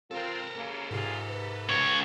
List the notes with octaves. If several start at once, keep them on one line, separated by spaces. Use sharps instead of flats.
C4 F4 A4 A#4
F#2 C#3 A#3
G#2 C3 G3 F4 G#4
B4
C#2 C#5